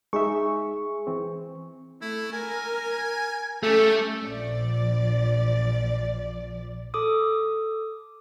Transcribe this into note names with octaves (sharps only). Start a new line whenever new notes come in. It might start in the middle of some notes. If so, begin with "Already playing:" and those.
G#3 D#4 G#4 E5 C#6
E3 C4
A3 E4
A#4 G#5
A3 C#4 G4 A4
A#1 F3 D5
A4 D6 D#6